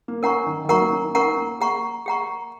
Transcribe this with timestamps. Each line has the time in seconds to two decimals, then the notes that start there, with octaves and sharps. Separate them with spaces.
0.08 A#3
0.23 C#4 A#4 F#5 A#5 C#6
0.46 D#3
0.65 D#3
0.69 F#3 A#4 F#5 A#5 C#6
0.81 A#3
0.92 C#4
1.03 D#4
1.15 C#4 A#4 F#5 A#5 C#6
1.37 A#3
1.61 G#4 F#5 A#5 C#6
2.06 G#4 F#5 A#5 C#6